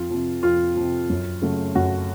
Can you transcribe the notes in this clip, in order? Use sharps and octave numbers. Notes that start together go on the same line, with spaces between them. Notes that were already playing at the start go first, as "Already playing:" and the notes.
Already playing: F2 F4
C3 F3
F2 F4
C3 F3
F#2
C#3 F#3 A3
F#2 F#4